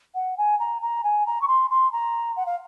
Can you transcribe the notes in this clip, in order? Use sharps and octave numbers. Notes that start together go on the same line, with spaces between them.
F#5
G#5
A#5
A#5
G#5
A#5
C#6
C6
C6
A#5
F#5
F5